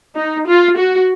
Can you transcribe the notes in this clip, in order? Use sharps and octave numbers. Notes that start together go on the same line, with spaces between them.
D#4
F4
F#4